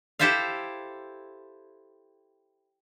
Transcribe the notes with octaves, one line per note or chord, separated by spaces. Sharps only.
E4 G4 A4 C5 E5 F5